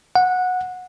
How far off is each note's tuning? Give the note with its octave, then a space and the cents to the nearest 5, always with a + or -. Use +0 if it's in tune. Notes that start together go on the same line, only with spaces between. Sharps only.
F#5 -15